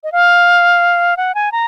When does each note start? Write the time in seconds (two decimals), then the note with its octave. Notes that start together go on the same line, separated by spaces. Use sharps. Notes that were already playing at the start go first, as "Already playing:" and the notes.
0.04 D#5
0.12 F5
1.17 F#5
1.35 G#5
1.52 A#5